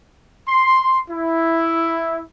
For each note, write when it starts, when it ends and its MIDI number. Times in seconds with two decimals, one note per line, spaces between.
0.47 0.99 84
1.10 2.21 64